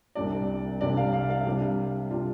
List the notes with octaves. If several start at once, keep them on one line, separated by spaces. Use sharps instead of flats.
C2 C3 G3 D4 D5
C2 C3 G3 D4 D5
F5
F5
F5
C3 G3 D4
C3 G3 D4 F4